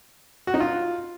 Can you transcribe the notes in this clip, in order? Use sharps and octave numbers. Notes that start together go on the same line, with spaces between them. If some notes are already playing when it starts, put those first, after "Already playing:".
F#4
D#4
F4